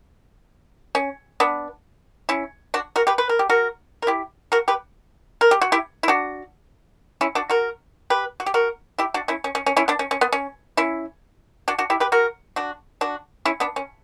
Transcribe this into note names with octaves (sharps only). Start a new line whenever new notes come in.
C#4
B3 D4
C#4 E4
D4 F#4
F#4 A#4
G4 B4
B4
A#4
G4
F#4 A#4
A#4
E4 G4
F#4 A#4
G4 B4
A#4
G4
F#4
E4 G4
E4
D4 F#4
C#4 E4
D4 F#4
F#4 A#4
G4 B4
F#4
G4
F#4 A#4
E4 G4
D4 F#4
C#4 E4
C#4
C#4
C#4
C#4 E4
B3 D4
C#4
C#4
B3
C#4
C#4 E4
D4 F#4
D4 F#4
E4 G4
G4 B4
F#4 A#4
D4 F#4
D4 F#4
C#4 E4
B3 D4
C#4